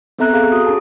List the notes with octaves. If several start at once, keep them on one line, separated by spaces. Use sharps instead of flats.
B3 C4 A4 E5 A#5 F#6
G#4 A4 F5 A#5
F#4 D#6
C#4 G#4 A5